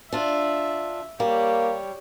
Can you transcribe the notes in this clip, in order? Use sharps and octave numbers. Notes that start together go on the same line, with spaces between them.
D4 F4 E5
G3 A#3 G4 C#5